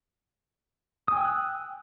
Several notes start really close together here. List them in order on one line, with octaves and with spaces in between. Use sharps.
D#6 G#5 G5 E6 F#6